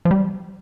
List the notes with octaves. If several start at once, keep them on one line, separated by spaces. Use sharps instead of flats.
F3
G3